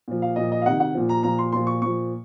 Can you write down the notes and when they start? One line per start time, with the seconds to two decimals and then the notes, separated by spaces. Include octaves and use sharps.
0.08 A#2 F3
0.22 F5
0.36 A#2 F3 D#5
0.52 D#5
0.61 F5
0.66 C3 D#3 F#5
0.80 F#5
0.95 A#2 F3
1.09 A#5
1.23 A#2 F3 A#5
1.38 C6
1.52 A#2 F3 C6
1.67 C#6
1.82 A#2 F3 C#6